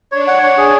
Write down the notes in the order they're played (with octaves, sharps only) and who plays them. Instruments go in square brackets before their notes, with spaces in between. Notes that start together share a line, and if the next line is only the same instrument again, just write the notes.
[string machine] D4 [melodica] C#5
[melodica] F#5
C#5
G#4